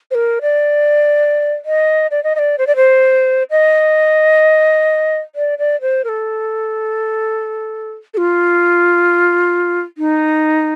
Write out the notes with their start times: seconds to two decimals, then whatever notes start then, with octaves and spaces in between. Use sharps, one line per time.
0.11 C5
0.15 A#4
0.42 D5
1.65 D#5
2.11 D5
2.24 D#5
2.35 D#5
2.39 D5
2.58 C5
2.67 D5
2.76 C5
3.50 D#5
5.35 D5
5.58 D5
5.81 C5
6.04 A#4
6.09 A4
8.14 A4
8.17 F4
9.98 D#4